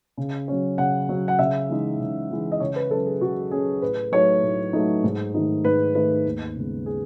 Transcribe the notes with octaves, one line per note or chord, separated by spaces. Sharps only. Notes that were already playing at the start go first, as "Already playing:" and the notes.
C#3
F#3 C#4
C#3 F#5
F#3 C#4
F#5
C#3 E5
E3 G#3 D#4
C#3
E3 G#3 D#4
D#5
C#3 C#5
B4
F#3 C#4 A4
G#4
C#3 F#4
F#3 C#4 G#4
A2 B4
F#3 A3 D#4 C#5
A2
F#3 A3 D#4
G#2
D#3 A3 D#4
G#2 B4
D#3 A3 D#4 B4
D#2
C#3 G#3 B3
G#4